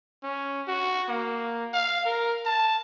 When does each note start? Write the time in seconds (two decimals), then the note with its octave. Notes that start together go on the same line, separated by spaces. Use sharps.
0.23 C#4
0.67 F#4
1.08 A#3
1.73 F5
2.05 A#4
2.45 A5